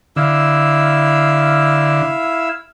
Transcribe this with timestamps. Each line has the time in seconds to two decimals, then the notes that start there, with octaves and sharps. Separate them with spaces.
0.17 D3 E4 F5 E6